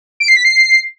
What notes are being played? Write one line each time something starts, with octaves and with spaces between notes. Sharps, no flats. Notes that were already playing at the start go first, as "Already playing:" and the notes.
D7
C7
B6
C7